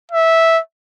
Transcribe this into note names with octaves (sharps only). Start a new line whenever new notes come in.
E5